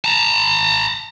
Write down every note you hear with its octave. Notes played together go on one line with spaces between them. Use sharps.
A5 A#5